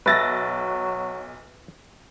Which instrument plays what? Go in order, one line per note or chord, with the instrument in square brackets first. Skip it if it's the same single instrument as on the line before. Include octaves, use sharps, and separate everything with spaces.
[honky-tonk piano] B1 A6 A#6 [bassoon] F#3 [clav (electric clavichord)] B4 E5 A5